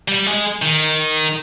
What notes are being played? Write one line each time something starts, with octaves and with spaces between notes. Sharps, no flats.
G3
G#3
D#3